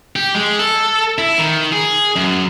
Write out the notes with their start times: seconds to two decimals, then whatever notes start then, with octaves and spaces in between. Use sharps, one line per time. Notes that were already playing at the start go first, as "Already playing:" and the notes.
0.16 G4
0.35 G#3
0.59 A4
1.18 E4
1.38 D#3
1.72 G#4
2.16 F#2